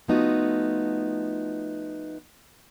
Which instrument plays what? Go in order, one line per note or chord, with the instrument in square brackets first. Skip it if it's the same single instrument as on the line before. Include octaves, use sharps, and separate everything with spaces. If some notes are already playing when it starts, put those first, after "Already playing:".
[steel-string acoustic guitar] F3 A3 B3 D#4 F4 F#4